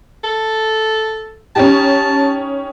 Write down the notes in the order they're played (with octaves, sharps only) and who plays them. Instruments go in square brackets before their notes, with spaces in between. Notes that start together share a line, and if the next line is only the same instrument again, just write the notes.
[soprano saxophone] A4
[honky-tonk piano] C#4 D#4 G4 [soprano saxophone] A5